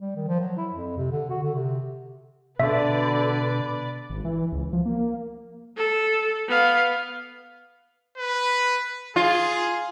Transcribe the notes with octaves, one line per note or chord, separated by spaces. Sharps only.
G3
D#3
F3
F#3
E4
F2
C3
D3
F#4
D3
C3
B2 D3 B4 D5 E5
G#1
E3
C#2
F3
A#3
A4
B3 F5
B4
F4 G#4